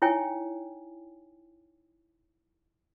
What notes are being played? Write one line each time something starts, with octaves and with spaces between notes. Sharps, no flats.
D#4 E4 C#5 G5 G#5